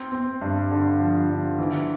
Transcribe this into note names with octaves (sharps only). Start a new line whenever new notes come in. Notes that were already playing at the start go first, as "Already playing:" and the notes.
Already playing: C4
C4
G2
D3
F3
D3
E3